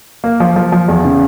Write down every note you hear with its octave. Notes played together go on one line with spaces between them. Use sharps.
A#3
F3
F3
F3
E2
C#3